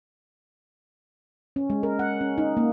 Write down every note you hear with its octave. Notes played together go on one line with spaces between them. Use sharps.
C#4
G#3
A#4
F#5
C#4
D#4
A#3